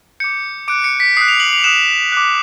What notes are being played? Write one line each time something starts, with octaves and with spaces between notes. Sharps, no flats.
D6 G6 C#7
D6 F#6 D7
C#7
B6
D#6 F#6 C7
F7
F#7
F7
D#6 F#6 E7
D6 F#6